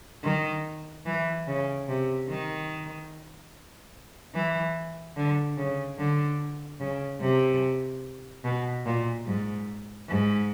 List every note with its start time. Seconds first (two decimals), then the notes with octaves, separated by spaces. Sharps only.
0.24 D#3
1.06 E3
1.47 C#3
1.88 C3
2.29 D#3
4.34 E3
5.17 D3
5.57 C#3
5.98 D3
6.80 C#3
7.21 C3
8.44 B2
8.86 A#2
9.26 G#2
10.08 G#2